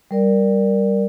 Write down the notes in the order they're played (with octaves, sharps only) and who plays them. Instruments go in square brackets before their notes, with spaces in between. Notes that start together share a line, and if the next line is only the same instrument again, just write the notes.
[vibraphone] G3 A#4 D5